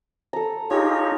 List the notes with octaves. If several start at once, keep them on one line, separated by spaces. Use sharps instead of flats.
A4 A#5
D#4 F4 G4 G#4 C#5